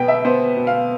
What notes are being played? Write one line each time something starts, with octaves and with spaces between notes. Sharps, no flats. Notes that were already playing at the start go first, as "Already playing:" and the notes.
Already playing: B2 B3 G5
E5
B3 C5
B2
F5